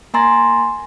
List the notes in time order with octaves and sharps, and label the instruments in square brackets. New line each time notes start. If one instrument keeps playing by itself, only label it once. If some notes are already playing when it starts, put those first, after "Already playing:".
[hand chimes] A#3 G#5 A#5 C6 A6